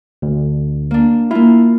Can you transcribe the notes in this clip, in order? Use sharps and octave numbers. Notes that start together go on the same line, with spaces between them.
D2
A#3 D4
A#3 E4 F4